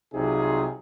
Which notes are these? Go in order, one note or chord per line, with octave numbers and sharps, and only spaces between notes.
C2 C3 F#3 D#4 F4 G#4